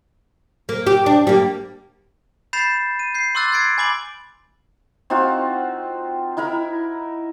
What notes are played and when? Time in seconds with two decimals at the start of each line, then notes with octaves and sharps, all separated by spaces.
0.69 A#3
0.87 G4
1.06 D4
1.27 G3 A#3
2.53 B5 G6 A6 C7 E7
2.99 D#7
3.14 G6 C7
3.35 C6 D6 E6 F#6 A6
3.52 G#6 A6 C7 D7
3.78 G#5 B5 D6 F#7
5.10 C4 D#4 F4 F#4
6.37 D#4 E4 A#4 B5